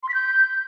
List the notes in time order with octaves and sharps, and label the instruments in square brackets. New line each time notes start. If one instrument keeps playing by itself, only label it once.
[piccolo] C6
B6
G6